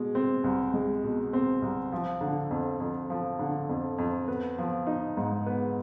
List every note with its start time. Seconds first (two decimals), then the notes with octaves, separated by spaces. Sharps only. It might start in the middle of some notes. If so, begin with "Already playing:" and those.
Already playing: B2 G#3
0.15 C4
0.44 C2
0.74 G#3
1.04 B2
1.33 C4
1.62 C2
1.92 F3
2.21 D3
2.50 F2
2.80 F2
3.10 F3
3.39 D3
3.69 F2
3.98 F2
4.28 B3
4.58 F3
4.87 D#4
5.17 G#2
5.46 B3